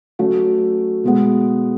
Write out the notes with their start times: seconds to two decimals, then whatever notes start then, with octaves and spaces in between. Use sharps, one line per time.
0.19 F#3 A3 C#4 F#4
1.04 B2 G#3 B3